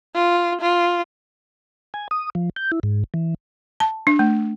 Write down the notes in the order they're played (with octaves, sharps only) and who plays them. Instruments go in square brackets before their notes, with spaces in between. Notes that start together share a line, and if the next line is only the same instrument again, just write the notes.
[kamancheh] F4
F4
[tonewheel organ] G#5
D#6
F3
G6
E4
G#2
E3
[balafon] A5
D4
A3